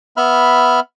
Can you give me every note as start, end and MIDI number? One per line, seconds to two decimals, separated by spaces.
0.17 0.80 59
0.17 0.80 76
0.17 0.80 83
0.17 0.80 89